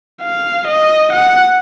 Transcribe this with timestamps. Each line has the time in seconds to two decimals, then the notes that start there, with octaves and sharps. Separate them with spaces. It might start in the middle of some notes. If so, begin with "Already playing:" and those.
0.22 F5
0.67 D#5
1.13 F#5